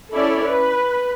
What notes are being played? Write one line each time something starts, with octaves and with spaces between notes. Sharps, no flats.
C#4 E4 A4 C#5 D5
B4